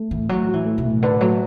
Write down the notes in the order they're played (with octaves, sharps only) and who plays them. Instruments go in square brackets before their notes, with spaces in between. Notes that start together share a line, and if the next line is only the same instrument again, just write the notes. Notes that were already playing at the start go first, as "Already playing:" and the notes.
Already playing: [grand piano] A3
[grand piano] A2 [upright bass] E3
[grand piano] A2 [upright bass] F#3
[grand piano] F#4
[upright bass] E3
[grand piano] A3
[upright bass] B2
[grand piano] A2
[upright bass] D3 [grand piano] B4
[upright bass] F#3 [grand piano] A3